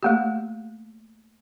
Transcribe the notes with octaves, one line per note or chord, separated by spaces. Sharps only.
A3 A#3 G4